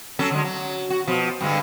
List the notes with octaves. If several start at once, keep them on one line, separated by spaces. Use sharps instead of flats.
F#3 C#4 A4
D3 G#3
F#3
F#4
B2 F3
G2 D3 G#3